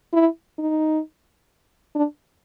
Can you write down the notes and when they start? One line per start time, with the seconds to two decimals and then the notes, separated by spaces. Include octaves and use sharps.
0.13 E4
0.59 D#4
1.95 D4